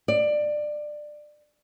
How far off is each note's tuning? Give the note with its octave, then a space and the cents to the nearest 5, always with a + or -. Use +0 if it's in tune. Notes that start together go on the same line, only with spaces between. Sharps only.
D5 +20